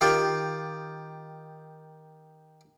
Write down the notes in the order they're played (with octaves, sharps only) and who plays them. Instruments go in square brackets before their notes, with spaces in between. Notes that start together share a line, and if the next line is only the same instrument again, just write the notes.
[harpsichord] D#3 F4 G4